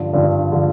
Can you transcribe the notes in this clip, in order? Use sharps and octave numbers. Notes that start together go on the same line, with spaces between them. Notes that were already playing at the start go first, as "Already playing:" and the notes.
Already playing: G2 D3 F3
G2 D3 F3
D3 F3